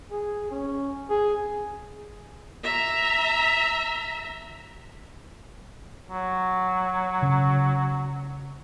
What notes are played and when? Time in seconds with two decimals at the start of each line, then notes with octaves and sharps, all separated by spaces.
0.11 G#4
0.51 C#4
1.10 G#4
2.63 E5 A#5
6.09 F#3
7.22 C#3